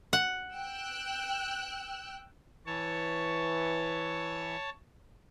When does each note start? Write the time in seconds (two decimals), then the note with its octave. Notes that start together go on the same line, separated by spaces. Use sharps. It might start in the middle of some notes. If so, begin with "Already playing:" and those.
0.13 F#5
0.53 G5 E6 F#6
2.66 E3 C#5 A5